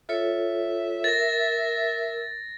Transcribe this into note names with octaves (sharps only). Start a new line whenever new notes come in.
F4 A4 C#5 E5
A#4 A6 A#6